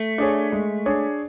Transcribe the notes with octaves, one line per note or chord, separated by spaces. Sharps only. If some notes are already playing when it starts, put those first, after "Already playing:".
Already playing: A3
D4 G#4 C#5
G#3
D4 G#4 C#5